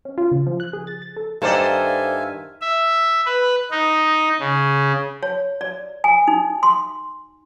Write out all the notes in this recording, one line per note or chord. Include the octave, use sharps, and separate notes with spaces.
C#4
F4
C#3
F3
F#6
G#4
A6
A6
A4
G2 D#3 A4 C5 D5 E5 F5 G#5
E5
B4
D#4
C#3
C#5
D5
G#5
D#4
C6